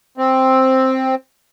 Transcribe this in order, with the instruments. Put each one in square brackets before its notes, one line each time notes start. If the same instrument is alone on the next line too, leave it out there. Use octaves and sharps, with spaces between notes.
[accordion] C4